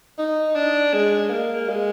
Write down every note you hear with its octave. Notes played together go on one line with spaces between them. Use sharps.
D#4
D4
G#3
A#3
G#3